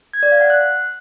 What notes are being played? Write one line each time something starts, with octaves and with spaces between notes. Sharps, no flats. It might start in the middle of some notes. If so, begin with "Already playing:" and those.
G#6
D5
F5
F#5
F#6